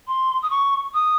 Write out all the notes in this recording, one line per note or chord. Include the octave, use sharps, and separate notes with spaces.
C6
D#6
C#6
D#6